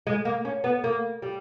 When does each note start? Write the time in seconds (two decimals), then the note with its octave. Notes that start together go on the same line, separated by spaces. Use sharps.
0.07 G#3
0.25 A#3
0.45 C#4
0.64 B3
0.84 A#3
1.22 G3